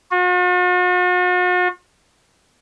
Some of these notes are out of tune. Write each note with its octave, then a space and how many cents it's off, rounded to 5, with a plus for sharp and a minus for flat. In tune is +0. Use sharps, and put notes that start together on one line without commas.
F#4 -45